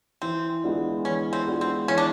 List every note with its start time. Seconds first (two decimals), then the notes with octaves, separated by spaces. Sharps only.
0.22 E3 C4
0.64 G#3 B3 D4 F4
1.05 E3 C#4
1.33 C4
1.47 G#3 B3 D4 F4
1.61 C4
1.88 E3 C#4
1.98 D4